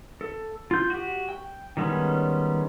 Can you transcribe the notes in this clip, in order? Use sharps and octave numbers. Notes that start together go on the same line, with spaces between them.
A4
F4 G6
F#4 G4
G5
D#3 G3 G#3 B3 C#4